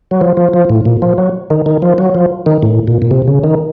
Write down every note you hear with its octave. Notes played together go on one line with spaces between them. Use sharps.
F#3
F3
F3
F3
A2
A#2
F3
F#3
D#3
D#3
F3
F#3
F3
D#3
A2
A#2
A#2
C3
C#3
D#3